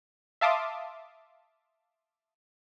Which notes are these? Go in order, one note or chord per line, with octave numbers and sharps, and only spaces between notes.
E5 F5 A5 C6 D6 D#6